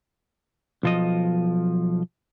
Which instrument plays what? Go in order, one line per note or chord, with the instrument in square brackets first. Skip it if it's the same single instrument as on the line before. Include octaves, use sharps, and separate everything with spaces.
[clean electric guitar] B1 F3 D#5